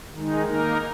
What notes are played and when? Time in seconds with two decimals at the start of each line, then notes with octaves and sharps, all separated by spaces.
0.13 D#3 G#3 D#4
0.46 A#3 D#4 A#4